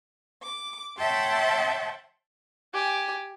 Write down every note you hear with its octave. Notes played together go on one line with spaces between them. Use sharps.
D6
C#5 E5 F#5 G5 A5 C6
G4 G#5